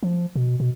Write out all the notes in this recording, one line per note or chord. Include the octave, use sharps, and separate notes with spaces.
F3
B2
B2